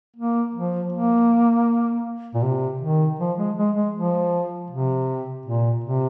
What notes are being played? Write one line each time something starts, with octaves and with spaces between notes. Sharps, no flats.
A#3
F3
A#3
A#2
C3
D#3
F3
G#3
G#3
G#3
F3
C3
A#2
C3